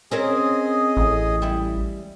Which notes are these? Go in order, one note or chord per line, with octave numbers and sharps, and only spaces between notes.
C4 C#4 G#4 A#4 D#5
A1
G3 E4